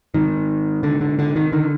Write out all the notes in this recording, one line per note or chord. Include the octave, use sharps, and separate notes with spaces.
G#2 D#3
D3
D3
D3
D#3
D3 D#3